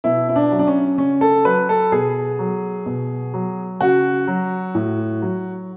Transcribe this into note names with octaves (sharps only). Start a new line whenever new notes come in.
B2 E4
E4
D4
F#3
D4
C#4
C#3 C#4
A4
F#3 B4
A4
B2 G#4
F#3
B2
F#3
C#3 F#4
F#3
A2
F#3